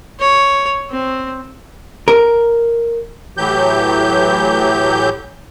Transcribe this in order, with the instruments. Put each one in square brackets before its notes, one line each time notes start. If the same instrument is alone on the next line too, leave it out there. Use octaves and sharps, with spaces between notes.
[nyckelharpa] C#5
C4
[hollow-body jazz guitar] A#4
[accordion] A2 E3 F#3 G4 G6